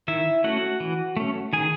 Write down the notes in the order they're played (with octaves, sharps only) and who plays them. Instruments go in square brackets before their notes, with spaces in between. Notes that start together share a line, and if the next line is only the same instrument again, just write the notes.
[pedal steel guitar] D#3 E4 E5
A3 C#4 F#4 F#5
E3
A3 C#4
D#3 G#4 G#5